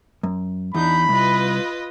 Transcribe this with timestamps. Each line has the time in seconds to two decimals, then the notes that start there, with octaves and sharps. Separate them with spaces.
0.23 F#2
0.75 E2 D4 D#4 B5 G6
1.09 C2 F4 B4 D#5